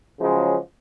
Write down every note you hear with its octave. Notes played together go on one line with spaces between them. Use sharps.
C#3 F3 F#3 G#3